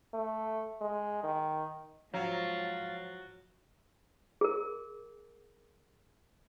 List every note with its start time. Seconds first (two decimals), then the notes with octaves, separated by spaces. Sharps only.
0.14 A3
0.81 G#3
1.23 D#3
2.14 G#2 F3 F#3 F5 A6
4.41 G#4 A#4